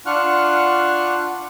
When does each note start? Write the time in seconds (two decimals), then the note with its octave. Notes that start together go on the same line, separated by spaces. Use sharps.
0.06 D4 F4 F#5 C#6 F6 F#6